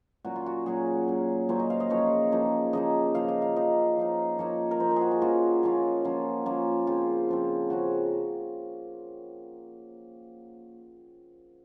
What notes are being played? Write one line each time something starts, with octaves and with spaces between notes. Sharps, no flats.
A#2 F#3 A#3 C#4 F#4
F4
F#4
A#2 F#3 A#3 C#4 G#4
A#2 F#3 A#3 C#4
A#2 F#3 A#3 C#4 C5
D#5
F5
D#5
C#3 F3 A#3 D#4 C#5
C#3 F3 A#3 D#4
C#3 F3 A#3 D#4 D#5
C#3 F3 A#3 D#4 F5
D#5
F5
F3 A#3 D#4 D#5
F3 A#3 D#4
F3 A#3 D#4 C#5
A#4
F3 A#3 D#4 C5
A#4
F#4 G#4
F4
F3 A#3 C#4 F4 F#4
F3 A#3 C#4 F4
F3 A#3 C#4 F4
F3 A#3 C#4 F4
C#3 F3 C4 F4
C#3 F3 C4
C#3 F3 C4 F#4